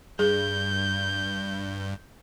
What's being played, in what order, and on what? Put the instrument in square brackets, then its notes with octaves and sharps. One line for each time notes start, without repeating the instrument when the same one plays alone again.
[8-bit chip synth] G2 [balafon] G#4 [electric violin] G6